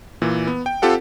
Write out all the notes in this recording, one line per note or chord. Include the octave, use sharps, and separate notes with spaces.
A#2 E3
B3
G5
C4 F4 G4 A4 F#5